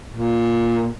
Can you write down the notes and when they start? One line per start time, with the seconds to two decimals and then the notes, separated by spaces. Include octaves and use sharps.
0.14 A#2